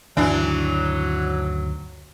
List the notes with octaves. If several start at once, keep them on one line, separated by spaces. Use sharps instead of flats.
D2 G2 D#3 E3 F#3 D4